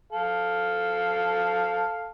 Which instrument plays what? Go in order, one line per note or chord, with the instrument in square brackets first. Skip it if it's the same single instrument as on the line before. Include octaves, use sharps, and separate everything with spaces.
[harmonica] A4 F5